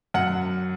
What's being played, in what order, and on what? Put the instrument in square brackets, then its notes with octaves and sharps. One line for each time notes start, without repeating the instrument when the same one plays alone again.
[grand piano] F#2 F#5